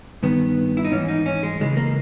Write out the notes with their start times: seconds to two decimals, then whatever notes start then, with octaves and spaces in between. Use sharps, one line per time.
0.23 G2 D#3 B3
0.77 E4
0.85 D#4
0.91 G#2 E3 C#4
1.08 D#4
1.26 C#4
1.43 G#3
1.60 C#2 C#3 E3 G#3
1.77 A#3